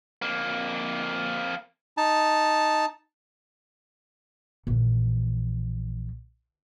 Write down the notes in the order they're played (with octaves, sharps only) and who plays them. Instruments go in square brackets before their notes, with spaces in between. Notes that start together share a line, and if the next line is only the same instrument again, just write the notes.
[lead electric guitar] F2 A#3
[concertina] D#4 A5
[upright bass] A#1 E3